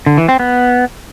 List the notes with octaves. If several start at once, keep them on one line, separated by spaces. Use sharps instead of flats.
D3
E3
C4
B3